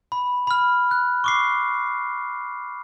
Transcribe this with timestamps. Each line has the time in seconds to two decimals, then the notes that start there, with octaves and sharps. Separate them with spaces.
0.12 B5
0.47 B5 F6
0.91 F#6
1.24 C#6 D6 C7